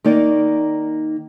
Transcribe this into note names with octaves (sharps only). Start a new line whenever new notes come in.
D#3 A#3 D#4 D5